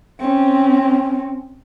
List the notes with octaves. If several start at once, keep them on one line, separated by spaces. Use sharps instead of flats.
C4 C#4